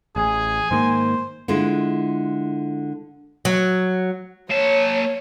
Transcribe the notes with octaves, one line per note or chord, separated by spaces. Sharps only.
A1 G#4 G#5
G#2 D#3 A#3 C5
D3 G#3 E4 F4
F#3
A#3 C#5 A5